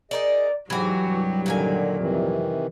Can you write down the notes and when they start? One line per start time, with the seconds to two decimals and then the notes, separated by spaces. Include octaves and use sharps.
0.11 D#4 G#4 A#4 D5 D#5
0.70 G#2 E3 F#3 F#4 G4
1.04 C2 G2 G3
1.46 A#2 D3 D#3 F5 G#5
1.98 F2 C3 D#3 E3 G3